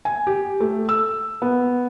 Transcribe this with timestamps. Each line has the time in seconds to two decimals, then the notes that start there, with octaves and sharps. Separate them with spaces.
0.05 G#5
0.27 G4
0.60 A3
0.89 E6
1.42 B3